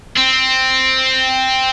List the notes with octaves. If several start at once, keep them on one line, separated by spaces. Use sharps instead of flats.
C4